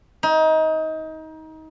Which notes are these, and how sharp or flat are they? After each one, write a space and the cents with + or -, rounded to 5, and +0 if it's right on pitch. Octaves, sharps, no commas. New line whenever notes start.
D#4 +25